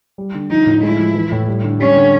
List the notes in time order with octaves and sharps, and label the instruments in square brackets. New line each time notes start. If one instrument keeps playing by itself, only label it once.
[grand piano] G3
D3
[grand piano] F3 [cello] D#4
[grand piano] A2
[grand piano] G#3 [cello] E4
[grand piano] F3
E3
A2
G3
D3
[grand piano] G3 [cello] C#4
[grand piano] D3